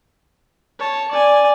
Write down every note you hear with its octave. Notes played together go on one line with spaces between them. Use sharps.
C#5 A5
D5 G#5